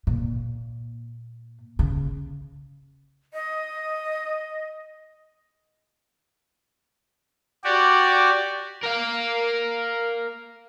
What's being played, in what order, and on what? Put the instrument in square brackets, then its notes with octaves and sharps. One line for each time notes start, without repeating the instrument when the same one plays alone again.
[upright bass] A#2
C#3
[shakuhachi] D#5
[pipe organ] F#4 G4 D5
[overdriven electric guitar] A#4 F5